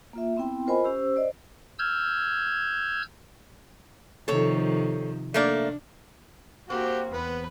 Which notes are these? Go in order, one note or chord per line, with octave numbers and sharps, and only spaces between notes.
A#3 F4 E5
B3 C4 E4 G5 C6
F4 A#4 C5 D#5 G#5 B5
C#4 G4 C5 E6
C5 D5 D#5
E6 F6 G6 G#6
C3 D#3 F3 A4 C#5
A3 A#3 D4 D5
A#3 C4 F#4 G4 F#5 G5
E2 B3 B4